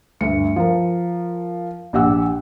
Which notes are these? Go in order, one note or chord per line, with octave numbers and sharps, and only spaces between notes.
D2 G2 C#7
F3 A#4
A#1 G4 F#5 E6